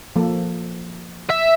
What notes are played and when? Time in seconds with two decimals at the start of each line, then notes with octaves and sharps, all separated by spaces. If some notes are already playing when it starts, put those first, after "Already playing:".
0.16 F3 A#3 A4
1.30 E5